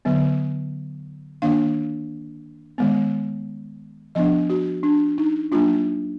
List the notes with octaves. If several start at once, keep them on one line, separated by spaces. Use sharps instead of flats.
D3 F#3 B3
D#3 A#3 D4 F5
D#3 G#3 B3
F3 B3 D4 D#5
F#4
D4
D#4
F#3 A#3 D4 F4